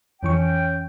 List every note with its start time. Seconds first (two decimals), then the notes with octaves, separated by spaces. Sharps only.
0.23 F2 E3 C#4 G5 C#6